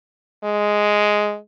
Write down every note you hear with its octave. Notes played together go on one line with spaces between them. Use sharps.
G#3